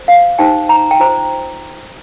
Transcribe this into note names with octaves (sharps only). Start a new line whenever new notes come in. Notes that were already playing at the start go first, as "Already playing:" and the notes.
Already playing: C5
F5
D#4 G4 C5 G5
A#5
G5
F4 C5 A#5